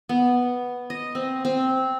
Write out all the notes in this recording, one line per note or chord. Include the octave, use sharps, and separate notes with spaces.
B3
D#5
C4
C4